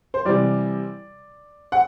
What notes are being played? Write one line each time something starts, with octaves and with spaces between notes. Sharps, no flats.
C5
C3 E3 G3 D5
F#5